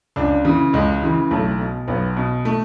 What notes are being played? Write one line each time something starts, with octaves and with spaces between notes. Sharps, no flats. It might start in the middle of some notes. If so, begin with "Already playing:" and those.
C#2 D4
C#3 E3
C#2 G#3
C#3 E3
B1 A3
B2
B1 B3
B2
A3